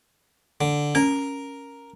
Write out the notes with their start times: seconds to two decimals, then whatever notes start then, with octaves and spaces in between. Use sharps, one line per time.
0.61 D3
0.95 C#4 A#4